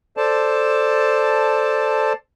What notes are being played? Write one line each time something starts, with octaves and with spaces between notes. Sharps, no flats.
A4 C5 D5 A5